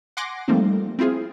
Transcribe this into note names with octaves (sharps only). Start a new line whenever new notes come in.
F#5 G#5 C6 D6 A#6
F3 G3 A3 A#3 C4 D#4
C4 E4 F4 G#4